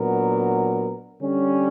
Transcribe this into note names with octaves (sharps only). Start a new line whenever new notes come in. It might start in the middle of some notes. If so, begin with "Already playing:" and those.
Already playing: A#2 F#3 B3 D4 A#4
D3 G3 C#4